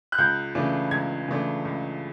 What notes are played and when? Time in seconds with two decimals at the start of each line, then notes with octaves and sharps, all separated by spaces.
0.12 F#6
0.18 C#2 G6
0.55 C#3 E3 A3 D4
0.91 C#2 G#6
1.28 C#3 E3 A3 D4
1.65 C#2